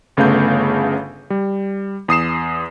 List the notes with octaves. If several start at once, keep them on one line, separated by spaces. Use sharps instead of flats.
G1 C#3 A3 B3 F5 G6
G3
E2 D#6 C7 E7